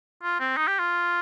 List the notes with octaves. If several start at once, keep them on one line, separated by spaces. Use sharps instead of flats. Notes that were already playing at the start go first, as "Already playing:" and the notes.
F4
C4
D#4
G4
F4